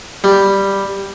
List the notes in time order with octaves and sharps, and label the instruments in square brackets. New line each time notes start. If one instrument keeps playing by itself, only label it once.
[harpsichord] G3